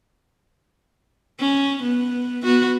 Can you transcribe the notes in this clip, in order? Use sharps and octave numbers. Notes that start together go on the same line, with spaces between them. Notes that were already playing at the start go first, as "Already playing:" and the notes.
C#4
B3
B3 F#4